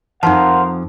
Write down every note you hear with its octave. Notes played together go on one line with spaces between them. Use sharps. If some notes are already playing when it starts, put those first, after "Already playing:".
F2 F3 D#4 A#4 C5 F5 F#5 A5